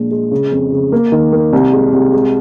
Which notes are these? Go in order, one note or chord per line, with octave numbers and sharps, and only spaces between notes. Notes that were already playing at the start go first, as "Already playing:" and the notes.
Already playing: A#1 A#2 G#3
G#3
C#3
F2
C#3
A#3
D#3
A#3
C2
G#3
C2
G#3